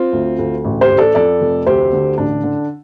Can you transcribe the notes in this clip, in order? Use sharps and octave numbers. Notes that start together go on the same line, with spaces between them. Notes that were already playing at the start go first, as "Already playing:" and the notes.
Already playing: C4 F4
D2
D2
A1
G4 C5
A1
A4 D5
F2 A4 D5
F1
D2 G4 C5
D3
A1 D4
D3